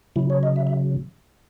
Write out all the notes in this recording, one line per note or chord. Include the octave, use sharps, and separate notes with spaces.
C#3 F#3 E4
C#5
D#5
E5
E5